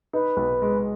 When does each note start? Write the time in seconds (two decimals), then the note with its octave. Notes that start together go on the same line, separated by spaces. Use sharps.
0.13 D#4 B4
0.37 B1
0.62 G#3